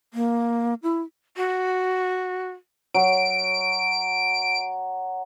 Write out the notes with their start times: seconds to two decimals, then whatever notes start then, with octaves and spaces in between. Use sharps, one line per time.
0.14 A#3
0.83 E4
1.37 F#4
2.94 F#3 D7